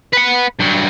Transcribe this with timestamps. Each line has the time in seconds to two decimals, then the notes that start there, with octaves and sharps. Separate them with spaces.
0.13 B4 F#5
0.59 G2 F#3